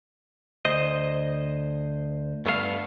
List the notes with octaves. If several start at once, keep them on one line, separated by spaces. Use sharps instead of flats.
D2 C5 D#5
G2 A3 B3 A4 F5